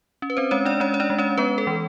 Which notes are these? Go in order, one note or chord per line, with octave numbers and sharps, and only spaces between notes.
C#4
B4
C4 C5
G#3 C#4 C#5
D4 D5
G#3 C#4 C#5
C#5
D4 D5
G#3
C#4 C#5
G#3 B3 B4
A4
E3